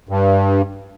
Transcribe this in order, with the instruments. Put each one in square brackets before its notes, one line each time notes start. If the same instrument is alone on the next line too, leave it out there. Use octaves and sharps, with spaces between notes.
[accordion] G2